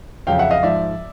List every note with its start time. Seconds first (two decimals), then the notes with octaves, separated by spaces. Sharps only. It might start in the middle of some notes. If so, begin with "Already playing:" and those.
0.27 F2 C#3 F#3 F5 G5
0.39 E5 F#5
0.51 D#5 F5
0.63 G#2 F3 D5 E5